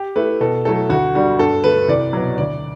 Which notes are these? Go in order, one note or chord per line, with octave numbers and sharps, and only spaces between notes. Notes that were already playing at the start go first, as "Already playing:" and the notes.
Already playing: G4
A3 E4 B4
B2 A4
F#3 A3 E4 A4
D2 F#4
D3 G3 D4 F#4
G2 A4
D3 A3 B4
C2 D5
B2 F#3
D2 D5